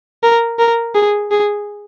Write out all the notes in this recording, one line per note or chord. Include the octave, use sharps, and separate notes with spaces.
A#4
A#4
G#4
G#4